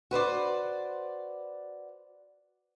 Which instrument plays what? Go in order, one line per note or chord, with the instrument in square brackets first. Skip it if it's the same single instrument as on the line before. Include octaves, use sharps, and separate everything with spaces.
[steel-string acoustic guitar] F#4 B4 C5 D5